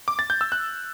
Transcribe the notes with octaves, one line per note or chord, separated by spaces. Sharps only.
D6
A6
G6
E6
F#6